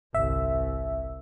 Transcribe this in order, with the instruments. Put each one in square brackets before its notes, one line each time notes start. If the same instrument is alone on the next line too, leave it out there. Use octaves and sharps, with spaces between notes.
[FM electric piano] G1 E5 [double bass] C2